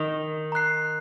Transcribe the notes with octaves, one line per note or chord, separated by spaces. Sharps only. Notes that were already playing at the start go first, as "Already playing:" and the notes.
Already playing: D#3
A#5 F#6 C7